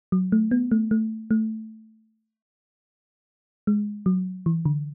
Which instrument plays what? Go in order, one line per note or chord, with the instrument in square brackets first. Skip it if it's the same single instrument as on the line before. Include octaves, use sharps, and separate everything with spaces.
[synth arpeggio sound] F#3
A3
B3
A3
A3
A3
G#3
F#3
E3
D3